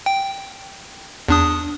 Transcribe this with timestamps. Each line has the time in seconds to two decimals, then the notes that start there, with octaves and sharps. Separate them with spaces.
0.06 G5
1.28 E2 D4 D#6